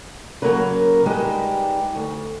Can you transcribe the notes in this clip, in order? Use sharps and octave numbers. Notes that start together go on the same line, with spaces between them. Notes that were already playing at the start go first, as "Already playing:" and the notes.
C#3 F#3 A#3 A#4 B4
G3 G#3 D#4 G4 B4 C5
D2